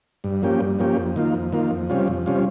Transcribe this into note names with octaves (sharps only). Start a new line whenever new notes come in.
G2
F3 A#3 C#4 G4
G2
F3 A#3 C#4 G4
F2
D#3 A#3 F4
F2
D#3 A#3 F4
F2
C3 G3 C#4 F4
F2
C3 G3 C#4 F4